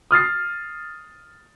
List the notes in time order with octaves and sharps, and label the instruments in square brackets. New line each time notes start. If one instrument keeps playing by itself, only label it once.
[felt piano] D#6 F6 A6 C7